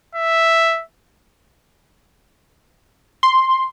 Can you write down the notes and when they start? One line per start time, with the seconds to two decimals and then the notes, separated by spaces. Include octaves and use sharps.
0.15 E5
3.23 C6